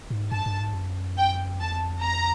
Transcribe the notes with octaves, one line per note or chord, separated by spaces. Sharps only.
G#2
G2 A5
G2
G#2
F#2
G5
F2 A5
A#5